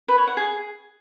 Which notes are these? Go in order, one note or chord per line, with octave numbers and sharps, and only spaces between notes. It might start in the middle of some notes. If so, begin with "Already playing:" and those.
B4
C#5
F#5
G#4